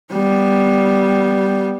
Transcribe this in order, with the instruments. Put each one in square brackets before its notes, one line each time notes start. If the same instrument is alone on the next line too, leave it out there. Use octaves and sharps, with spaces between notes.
[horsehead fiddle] G3 B3